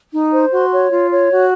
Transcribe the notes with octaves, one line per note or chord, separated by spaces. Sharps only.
D#4
C5
F#4 C6
C#5
F4
C#5
F#4